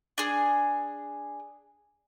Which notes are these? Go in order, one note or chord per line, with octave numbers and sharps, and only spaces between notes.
D4 G#4